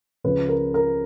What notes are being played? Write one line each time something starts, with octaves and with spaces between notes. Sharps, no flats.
C#2 C#3 F3 B4
A#4
A#4